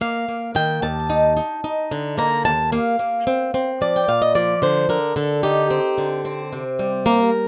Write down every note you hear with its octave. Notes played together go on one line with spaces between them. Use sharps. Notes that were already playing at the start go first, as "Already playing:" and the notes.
A#3 F5
A#3
D#3 G5
D#2 A5
D#4
D#4
D#4
D3
A#3 A#5
D#2 A5
A#3 F5
A#3
C4
C4
F3 D5
G5
A#2 F5
D#5
F3 D5
D3 C5
D3 A#4
D3 A4
D#4 G4
C4
D3
C4
C3
G3
A#3 A#4